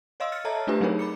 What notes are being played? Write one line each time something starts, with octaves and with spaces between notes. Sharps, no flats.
C#5 D#5 F5 C6 E6
F6 A6 C#7
A4 C#5 D#5 E5 A5 A#5
A3 D4 F4 G4 B4
F#3 C4 D#4 G#4 A#4 C#5
B5 D6 C#7